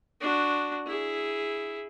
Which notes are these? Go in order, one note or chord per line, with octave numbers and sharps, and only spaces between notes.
D4 F#4
E4 G#4